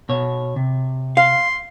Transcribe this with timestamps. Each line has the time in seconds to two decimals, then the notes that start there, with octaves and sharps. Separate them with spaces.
0.09 B2 C#5
0.56 C3
1.17 F5 C6